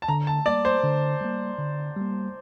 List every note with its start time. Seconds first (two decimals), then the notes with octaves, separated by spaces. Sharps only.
0.02 A5
0.08 D3 A#5
0.27 A5
0.46 G3 A#3 D5
0.65 C5
0.83 D3
1.21 G3 A#3
1.59 D3
1.97 G3 A#3